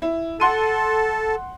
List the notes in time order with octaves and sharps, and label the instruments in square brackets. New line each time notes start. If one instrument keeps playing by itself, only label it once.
[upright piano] E4
[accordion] A4 [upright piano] F#5 C6 D#7